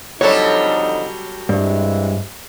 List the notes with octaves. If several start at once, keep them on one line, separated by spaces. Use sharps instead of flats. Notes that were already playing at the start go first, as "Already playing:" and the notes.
F2 D3 F#3 G3 D#4 A4 C#5
G2 C3 E3 G#3